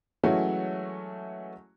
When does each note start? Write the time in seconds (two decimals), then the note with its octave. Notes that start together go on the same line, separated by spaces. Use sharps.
0.23 E3 F#3 G#3 A3 C#4 F#4